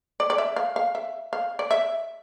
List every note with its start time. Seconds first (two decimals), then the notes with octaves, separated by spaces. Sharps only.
0.20 D5
0.30 D5
0.38 E5
0.56 F5
0.76 F5
0.95 E5
1.33 F5
1.59 D5
1.71 E5